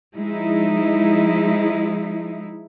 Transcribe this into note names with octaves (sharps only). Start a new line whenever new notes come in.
F3 G#3 D#4 E4